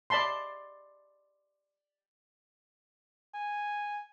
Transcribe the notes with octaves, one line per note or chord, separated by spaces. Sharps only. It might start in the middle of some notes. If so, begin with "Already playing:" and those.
D5 D#5 A5 B5 C6
G#5